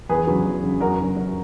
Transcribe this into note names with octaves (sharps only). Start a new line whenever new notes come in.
E2 G#4 B4
C#3 F#3
E2
C#3 F#3
F#2 F#4 A#4
C#3 F#3
F#2